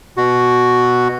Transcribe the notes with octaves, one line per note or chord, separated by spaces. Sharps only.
B2 F#4